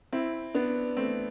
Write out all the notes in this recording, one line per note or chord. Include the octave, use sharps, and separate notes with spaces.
C4 E4
B3 D4
A3 C4